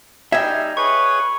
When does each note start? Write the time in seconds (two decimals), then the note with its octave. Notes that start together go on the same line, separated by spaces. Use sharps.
0.32 G3 D#4 E5 G5 G#5
0.77 G#4 B4 C#5 C#6